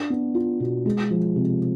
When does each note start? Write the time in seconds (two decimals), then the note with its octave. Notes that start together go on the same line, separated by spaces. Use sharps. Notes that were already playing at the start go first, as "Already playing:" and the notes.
Already playing: D4
0.10 B3
0.35 F4
0.60 B2
0.86 G#3
1.10 F3
1.36 C3